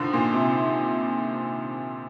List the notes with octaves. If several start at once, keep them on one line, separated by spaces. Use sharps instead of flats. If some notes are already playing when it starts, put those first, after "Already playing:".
Already playing: D3 D#3 F3
A#2
C3